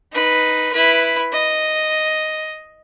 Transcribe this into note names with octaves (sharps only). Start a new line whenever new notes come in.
D#4 B4
E4 B4
D#5